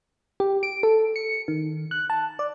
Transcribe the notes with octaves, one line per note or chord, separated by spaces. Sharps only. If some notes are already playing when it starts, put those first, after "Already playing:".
G4
D7
A4
C#7
D#3
F#6
A5
D5